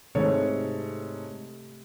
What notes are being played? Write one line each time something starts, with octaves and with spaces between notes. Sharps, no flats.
G#2 C3 A3 A4 C#5